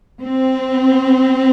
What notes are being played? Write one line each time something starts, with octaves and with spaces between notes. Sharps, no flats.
C4